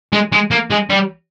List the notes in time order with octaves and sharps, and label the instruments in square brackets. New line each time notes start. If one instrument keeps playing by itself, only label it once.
[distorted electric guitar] G#3
G#3
A#3
G#3
G3